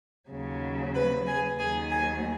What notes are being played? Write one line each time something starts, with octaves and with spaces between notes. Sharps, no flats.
D#2 C#3 F#3
B4 B5
G#4 G#5
D#2 D#3 F#3 G#4 G#5
G#4 G#5